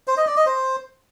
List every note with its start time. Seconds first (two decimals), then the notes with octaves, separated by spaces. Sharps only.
0.07 C5
0.17 D#5
0.27 D5
0.36 D#5
0.46 C5